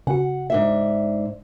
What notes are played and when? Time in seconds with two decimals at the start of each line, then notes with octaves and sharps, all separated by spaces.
0.07 C#3 F#4 F#5
0.50 G#2 D4 E5